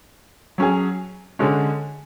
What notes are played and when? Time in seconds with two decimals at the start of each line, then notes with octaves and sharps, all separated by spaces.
0.58 F#3 C#4 G#4
1.39 D3 G#3 C#4